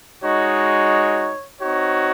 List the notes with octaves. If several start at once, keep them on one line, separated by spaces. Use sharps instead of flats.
G#3 D#4 F#4 C#5
C4 D#4 F#4 C#5